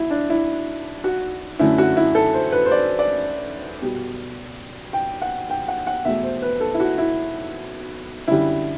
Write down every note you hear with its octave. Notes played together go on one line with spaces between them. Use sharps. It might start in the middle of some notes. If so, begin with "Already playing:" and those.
Already playing: E4 F#4
D4
E4
F#4
F#2 D3 A3 E4
F#4
E4
A4
C5
B4
C5
D5
D5
B2 G3
G5
F#5
G5
F#5
F#5
E2 B2 A3 E5
C5
B4
A4
E4
F#4
E4
F#2 D3 G3 E4